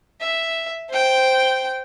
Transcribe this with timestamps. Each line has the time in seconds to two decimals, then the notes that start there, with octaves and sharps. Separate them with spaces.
0.21 E5
0.90 C5 G5